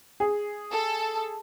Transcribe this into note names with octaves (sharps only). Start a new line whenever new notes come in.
G#4
A4